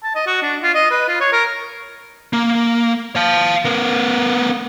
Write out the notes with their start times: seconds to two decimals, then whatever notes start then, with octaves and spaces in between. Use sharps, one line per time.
0.04 A5
0.15 D#5
0.27 F#4
0.42 D4
0.63 F4
0.74 D#5
0.91 B4
1.08 F4
1.20 C#5
1.32 A#4
2.33 A#3
3.16 F5 A5
3.65 B3 A#4